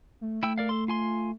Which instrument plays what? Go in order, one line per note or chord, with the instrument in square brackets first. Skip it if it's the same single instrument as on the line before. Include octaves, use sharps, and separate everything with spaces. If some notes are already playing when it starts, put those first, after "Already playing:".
[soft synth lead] A3
[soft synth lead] A3 [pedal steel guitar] E4 G5 E6
[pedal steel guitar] A#4 D5 F5
A4 C6
F4 G#5 C6